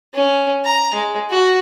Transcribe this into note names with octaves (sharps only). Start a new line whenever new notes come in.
C#4
A#5
G#3
F#4